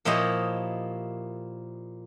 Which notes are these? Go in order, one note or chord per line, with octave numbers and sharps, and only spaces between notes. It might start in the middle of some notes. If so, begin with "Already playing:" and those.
A#2 F3 E4 G4 C#5 D#5